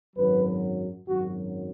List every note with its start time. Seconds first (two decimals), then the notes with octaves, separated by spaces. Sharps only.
0.16 G#1 F#2 F#3 B4
1.08 G#1 F#2 F#3 F#4